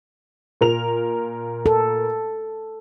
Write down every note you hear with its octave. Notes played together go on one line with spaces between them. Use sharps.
A#2 A#4 F7
A4